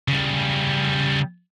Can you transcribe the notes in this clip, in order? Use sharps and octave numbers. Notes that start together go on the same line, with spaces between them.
C#3 G3